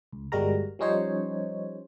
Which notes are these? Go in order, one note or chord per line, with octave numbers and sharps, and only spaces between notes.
C#2
G1 G3 G#3 F#4 A#4 A#5
F3 G3 C#4 D#4 C5 C#5